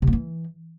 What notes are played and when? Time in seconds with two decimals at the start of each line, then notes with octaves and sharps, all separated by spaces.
0.02 C3
0.07 A#3
0.13 E3